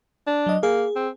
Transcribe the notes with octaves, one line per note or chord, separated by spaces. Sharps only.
D4
F#3 D#5
A#3 G#4
C4